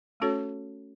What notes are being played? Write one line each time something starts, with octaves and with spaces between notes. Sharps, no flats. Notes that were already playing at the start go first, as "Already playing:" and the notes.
A3 C#4 F#4 A4 C#5